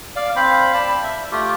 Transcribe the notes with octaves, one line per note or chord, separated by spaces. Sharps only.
D5 F5
C4 C5 F5 B5
D5 A5 B5
E5
A3 F4 G4